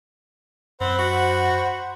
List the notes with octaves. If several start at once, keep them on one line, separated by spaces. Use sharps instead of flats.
F#2 C4 C5 F#5 B5
F#4